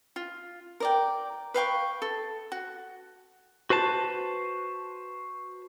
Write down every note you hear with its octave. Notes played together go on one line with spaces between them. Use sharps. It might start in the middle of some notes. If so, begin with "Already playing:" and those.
F4
A#4 D5 G5
B4 F5 G5 C#6
A4
F#4
F#4 B4 C5 A5